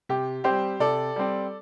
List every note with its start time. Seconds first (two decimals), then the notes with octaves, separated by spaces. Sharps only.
0.09 C3 G4
0.44 G3 C4 G4 C5
0.80 C3 A4 D5
1.16 G3 C4